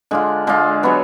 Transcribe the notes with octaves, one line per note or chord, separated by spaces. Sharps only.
D3 G#3 D4 F4
D3 G#3 D4 F4
F#3 B3 F#4 C#5